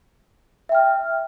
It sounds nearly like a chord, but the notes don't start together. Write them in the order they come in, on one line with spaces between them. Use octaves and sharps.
E5 G5 F6